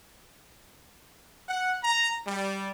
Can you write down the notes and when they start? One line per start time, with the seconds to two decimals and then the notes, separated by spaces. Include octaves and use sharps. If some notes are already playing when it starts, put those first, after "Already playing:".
1.48 F#5
1.83 A#5
2.26 G3